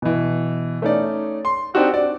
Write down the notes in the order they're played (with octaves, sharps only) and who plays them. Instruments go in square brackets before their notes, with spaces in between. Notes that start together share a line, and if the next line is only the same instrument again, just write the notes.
[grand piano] B2 E3
A3 C#4 D#4 D5
C6
C4 D4 D#4 F#4 G4
D5